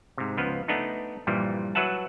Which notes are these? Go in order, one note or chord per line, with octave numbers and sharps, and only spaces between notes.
G#2 C3
C#2 F3 B3
A3 B3 D4 D#4
G2 A#2 E3 F3 G3
F#3 B4 E5 F#5 A5